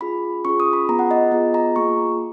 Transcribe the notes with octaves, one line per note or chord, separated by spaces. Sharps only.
C#4 F4 G#4 B5
C#4 F4 G#4 C#6
D#6
B5
B3 F4 G#4 A#5
F#5
D#5
B3 F4 G#4 D#5
A#5
A#3 F4 G#4 C#6